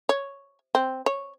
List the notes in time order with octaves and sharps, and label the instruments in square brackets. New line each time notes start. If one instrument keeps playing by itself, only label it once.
[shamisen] C#5
C4
C#5